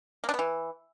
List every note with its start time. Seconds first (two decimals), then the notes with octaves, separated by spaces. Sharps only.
0.24 A#3
0.29 D4
0.34 B3
0.39 E3